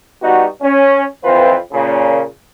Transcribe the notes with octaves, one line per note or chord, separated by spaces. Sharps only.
G3 B3 D#4 F#4
C#4
F2 E3 C4 F4 B4 C5
A#2 C#3